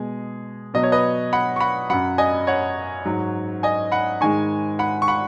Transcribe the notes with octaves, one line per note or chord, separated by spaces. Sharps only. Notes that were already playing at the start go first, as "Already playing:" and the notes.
Already playing: B2 G#3 G#4
B2 F#3 D#5
C#5
B4 D#5
F#5 B5
C#6
F#5 B5
F#2 F#3 F#5 B5
D#5 G#5
C#5 F#5
G#2 F#3
D#5 G#5
F#5 B5
G#2 D#3 G#3 G#5 C#6
F#5 B5
C#6
F#5 B5